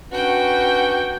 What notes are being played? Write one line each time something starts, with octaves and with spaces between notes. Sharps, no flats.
C#4 D4 F#4 B4 G5